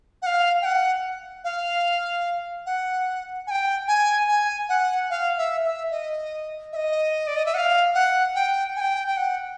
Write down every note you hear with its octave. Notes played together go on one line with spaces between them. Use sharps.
F#5
F5
G5
F#5
F5
F#5
G#5
G5
G#5
G#5
F#5
F5
E5
E5
D#5
E5
D#5
D5
D#5
E5
F#5
F5
F#5
G5
G#5
G5
G5
F#5